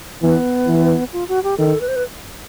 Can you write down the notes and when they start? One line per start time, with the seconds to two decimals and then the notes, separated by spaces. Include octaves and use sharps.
0.22 E3 B3
0.67 E3
1.13 F4
1.28 F#4
1.44 G4
1.58 D#3 A4
1.81 B4
1.88 C5
1.96 B4